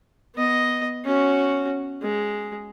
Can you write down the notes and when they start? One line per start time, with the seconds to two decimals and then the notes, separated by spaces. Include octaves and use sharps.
0.35 B3 D#5
1.05 C#4 F#4
2.02 G#3